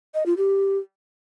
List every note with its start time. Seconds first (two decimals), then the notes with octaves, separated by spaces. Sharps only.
0.15 D#5
0.26 F4
0.37 G4